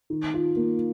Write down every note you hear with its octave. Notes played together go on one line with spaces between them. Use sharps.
D#3
F4
A#3